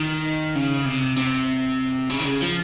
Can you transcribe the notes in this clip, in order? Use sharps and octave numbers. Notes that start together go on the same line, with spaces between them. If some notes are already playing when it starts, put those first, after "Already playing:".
Already playing: D#3
C#3
C3
C3
C#3
D#3
C#3
F3